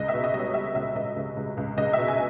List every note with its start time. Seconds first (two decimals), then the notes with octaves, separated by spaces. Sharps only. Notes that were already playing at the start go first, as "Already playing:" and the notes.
Already playing: C#2 D#5
0.08 B2 E5
0.24 D#5
0.34 G3 D#5
0.39 C#5
0.54 G3 E5
0.75 C#2 E5
0.95 C#2 D#5
1.16 C#2
1.36 C#2
1.57 C#2
1.77 C#2 D#5
1.93 B2 E5
2.08 G#5